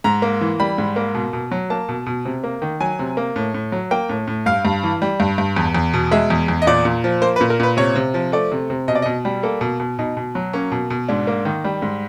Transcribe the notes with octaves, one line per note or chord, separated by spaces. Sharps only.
G#2 A#5
A#3
E3
G3 B5
G#2
A#3
B2
B2
F#3
A#3 A5
B2
B2
C3
A#3
D#3
F#3 G#5
C3
A#3
A2
A2
F#3
A#3 G5
A2
A2
G2 F5
G2
E3
G3
G2
G2
E2
E2
B2
G#3 E5
E2
E2
D#5
A#2 D5
A#2
F3
A#3 C5
B4
A#2
A#4
A#2 B4
C3 C#5
C3
F3
A3 D5
C3
C3
B2 D#5
D5
B2 D#5
G3
A#3 A4
B2
B2
B2 D#4
B2
F#3
A#3 C#4
B2
B2
G#2 D4
A#3
D#3
G3
G#2